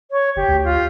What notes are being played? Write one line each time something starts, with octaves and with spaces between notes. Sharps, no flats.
C#5
G1 G4
D2
F4